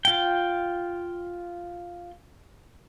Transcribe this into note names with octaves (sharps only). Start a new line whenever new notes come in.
F4 G5